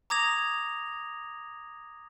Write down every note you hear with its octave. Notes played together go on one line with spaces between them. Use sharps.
A#5 D6 D#6 G#6 A#6 F7